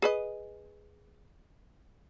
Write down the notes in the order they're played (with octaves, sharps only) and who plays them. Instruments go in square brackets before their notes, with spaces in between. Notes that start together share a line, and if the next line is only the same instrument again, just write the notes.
[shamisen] G#4 B4 D#5